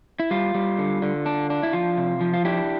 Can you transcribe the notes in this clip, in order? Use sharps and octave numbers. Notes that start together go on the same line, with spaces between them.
E4
G3 F4
G3
D3
D3
D4
D4
E4
F3 F4
C3
F3
F4
D4 E4 G4